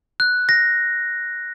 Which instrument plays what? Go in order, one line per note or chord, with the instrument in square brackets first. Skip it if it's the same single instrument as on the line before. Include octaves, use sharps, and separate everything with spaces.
[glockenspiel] F#6
A#6